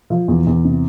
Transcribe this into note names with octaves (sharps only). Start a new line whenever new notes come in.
F3
E2
E2
C3